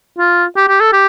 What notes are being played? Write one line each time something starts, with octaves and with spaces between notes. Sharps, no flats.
F4
G4
G4
A4
G4